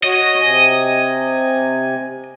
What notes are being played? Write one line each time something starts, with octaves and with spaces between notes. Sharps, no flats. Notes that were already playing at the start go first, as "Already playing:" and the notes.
F#4 C#5 D#5
C3 G#5